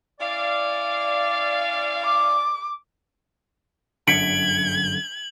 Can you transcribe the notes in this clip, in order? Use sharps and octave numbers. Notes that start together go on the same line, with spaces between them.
C#4 E4 D5 F5
D6
G1 F#2 D3 G#6 B6 C#7 D7 F#7